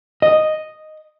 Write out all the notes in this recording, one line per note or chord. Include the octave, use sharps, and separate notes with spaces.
D#5